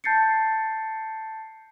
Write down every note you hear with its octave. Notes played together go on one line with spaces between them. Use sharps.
A5 G6 A6 C7 C#7